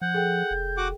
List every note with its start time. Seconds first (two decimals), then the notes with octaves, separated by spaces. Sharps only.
0.02 F3 F#5 G6
0.14 G#4 A4 G5
0.51 F1
0.77 F#4 F#5 D6